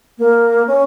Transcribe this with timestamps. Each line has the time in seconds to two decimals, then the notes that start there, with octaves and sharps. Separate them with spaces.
0.18 A#3
0.67 C#4